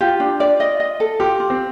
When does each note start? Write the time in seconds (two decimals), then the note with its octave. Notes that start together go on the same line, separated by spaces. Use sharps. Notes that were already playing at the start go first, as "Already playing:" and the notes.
0.01 F4 G4
0.20 D4
0.40 D5
0.60 D#5
0.80 D#5
1.00 A4
1.20 F4 G4
1.40 F4
1.50 C4